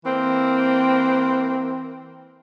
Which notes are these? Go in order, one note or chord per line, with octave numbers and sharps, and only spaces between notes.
E3 A#3 C4